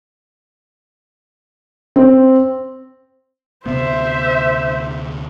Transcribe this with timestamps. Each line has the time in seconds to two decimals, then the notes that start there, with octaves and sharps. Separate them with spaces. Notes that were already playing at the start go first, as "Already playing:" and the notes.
1.96 C4
3.66 D2 C3 B3 C5 E5